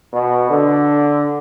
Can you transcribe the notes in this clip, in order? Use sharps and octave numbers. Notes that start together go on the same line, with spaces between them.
B2
D3